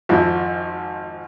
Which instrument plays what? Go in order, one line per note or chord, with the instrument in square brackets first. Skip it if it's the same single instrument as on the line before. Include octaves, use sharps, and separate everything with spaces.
[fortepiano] G#1 F2 E4